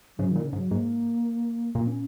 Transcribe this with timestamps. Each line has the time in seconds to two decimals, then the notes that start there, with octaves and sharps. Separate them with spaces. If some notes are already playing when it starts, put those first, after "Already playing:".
0.18 G#2 C#3 F#3
0.31 A#2 D#3
0.45 C#3
0.53 G#2
0.57 F#3
0.71 G#2 A#3
1.74 A#2 A#3
1.87 C#4